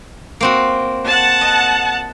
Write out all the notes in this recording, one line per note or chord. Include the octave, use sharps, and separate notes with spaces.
A#3 C4 F#4
F#5 A5
D#5